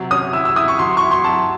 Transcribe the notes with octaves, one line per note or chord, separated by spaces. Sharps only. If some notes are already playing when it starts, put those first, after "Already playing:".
Already playing: C3 F#3
C#4 D#6
E4 E6
E6
E4 D#6
C#6
F#3 C6
E4 C#6
C6
F#3 A5